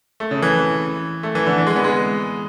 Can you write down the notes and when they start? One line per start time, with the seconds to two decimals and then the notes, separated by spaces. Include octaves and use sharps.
0.20 A3
0.31 C#3
0.42 E3
1.23 A3
1.35 E3
1.46 D3
1.58 E3
1.67 G#3
1.76 B3
1.84 G#3